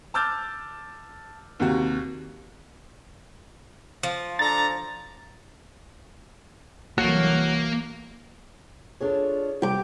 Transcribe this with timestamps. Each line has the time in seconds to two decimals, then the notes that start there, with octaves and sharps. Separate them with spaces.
0.14 A5 D6 E6 F6 G6 A6
1.60 D#2 C3 F#4
4.03 F3
4.39 D4 A4 A#5 A6
6.98 C2 E3 F#3 A#3 F#4 A4 C#5
9.00 D4 F4 G#4 A4 C#5
9.62 C3 G3 G4 D6